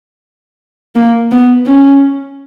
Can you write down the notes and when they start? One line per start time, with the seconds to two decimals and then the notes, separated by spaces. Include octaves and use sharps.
0.95 A#3
1.31 B3
1.66 C#4